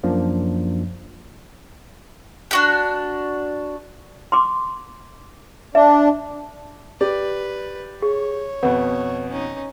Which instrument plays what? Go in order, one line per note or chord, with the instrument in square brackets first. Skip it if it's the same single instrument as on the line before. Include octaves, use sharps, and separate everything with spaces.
[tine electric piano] F#2 F3 A#3 D4
[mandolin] D4 F#4 G4
[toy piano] C6 D6
[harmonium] D4 [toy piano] E5
[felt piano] G4 [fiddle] B4 [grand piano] D5
[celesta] G#4 [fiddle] C#5
[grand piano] F2 B2 [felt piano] B4 [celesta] F#5
[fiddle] C#4 D#4